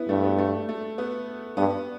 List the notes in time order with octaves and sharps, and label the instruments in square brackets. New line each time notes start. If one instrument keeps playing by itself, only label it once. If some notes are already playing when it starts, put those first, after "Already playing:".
Already playing: [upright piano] B3 E4
[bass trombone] G2 [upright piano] A3
[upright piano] B3
A3
A3
B3
[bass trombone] G2 [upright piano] B3